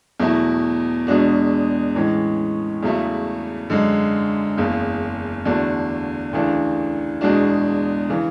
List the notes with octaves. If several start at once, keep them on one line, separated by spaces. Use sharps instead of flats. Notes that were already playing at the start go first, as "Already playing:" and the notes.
E2 B2 F#3 A3 E4
E2 B2 G#3 D4 F#4
A2 E3 G#3 C#4
E2 C#3 F#3 A3 E4
F#2 D3 G#3
F#1 E2 C#3
E2 D3 A3 D4 F#4
D2 C#3 E3 A3 D4
E2 B2 G#3 D4 F#4
C#3 E3